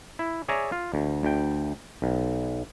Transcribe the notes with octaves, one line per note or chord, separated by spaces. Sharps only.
E4
G#4 C#5 D5 E5 G#5 A#5
F4
D2
D2 G5
B1